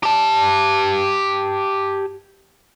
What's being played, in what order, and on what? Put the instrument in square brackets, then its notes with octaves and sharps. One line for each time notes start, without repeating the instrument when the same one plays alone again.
[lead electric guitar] G4 A5